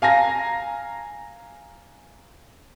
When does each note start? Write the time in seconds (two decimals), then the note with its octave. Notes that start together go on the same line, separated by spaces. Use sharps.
0.02 F5 G#5 A#5 A#6